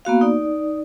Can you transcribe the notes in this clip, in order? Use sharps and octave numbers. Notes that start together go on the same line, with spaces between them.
A#3 B3 F#4 F5
D#4 D5